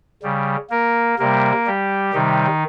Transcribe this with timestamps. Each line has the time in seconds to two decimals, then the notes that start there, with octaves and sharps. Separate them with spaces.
0.23 C#3 G3
0.70 A#3 A#4
1.19 C3 G3 A#3 A#4
1.67 G3 G4
2.14 C3 D#3 G3 D#4